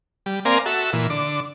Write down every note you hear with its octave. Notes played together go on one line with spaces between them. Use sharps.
G3
A#3 C4 A#4 D5 F5 G#5
F#4 A4 E5
A#2 E3
D3 D6